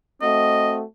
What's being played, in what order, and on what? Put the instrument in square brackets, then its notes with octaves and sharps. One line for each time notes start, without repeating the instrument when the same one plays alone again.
[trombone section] A3 C4 F#4 [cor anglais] D#5